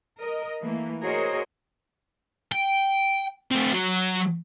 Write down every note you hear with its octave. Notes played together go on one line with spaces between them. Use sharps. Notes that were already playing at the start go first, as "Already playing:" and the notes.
A#4 D#5
E3 A3 A#3
F#4 G#4 A#4 C5 C#5 D#5
G5
A3 C4
F#3